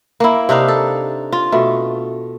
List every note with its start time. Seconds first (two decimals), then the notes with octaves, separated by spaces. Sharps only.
0.20 A#3 E4
0.49 C3 D4 D#4 F5
0.68 A4
1.32 F4
1.52 B2 A3